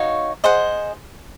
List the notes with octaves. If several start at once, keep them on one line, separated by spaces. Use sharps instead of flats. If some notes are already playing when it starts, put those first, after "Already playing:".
Already playing: D#4 F#4 C#5 F5
G#4 C5 D#5 F#5